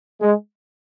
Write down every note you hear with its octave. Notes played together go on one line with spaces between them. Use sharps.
G#3